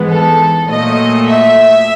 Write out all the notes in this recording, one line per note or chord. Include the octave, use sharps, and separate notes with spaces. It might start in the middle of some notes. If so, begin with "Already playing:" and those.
Already playing: G#2 E3 G#3 B3
A4
A#2 F#3 A3 D#5
E5